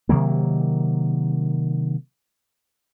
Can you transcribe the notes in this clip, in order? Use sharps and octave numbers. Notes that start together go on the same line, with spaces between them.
C3 D#3 F#3 A#3